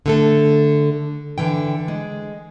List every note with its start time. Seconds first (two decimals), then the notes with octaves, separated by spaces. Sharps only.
0.06 D3 A3 A4
1.38 D3 E3 G5
1.88 G#3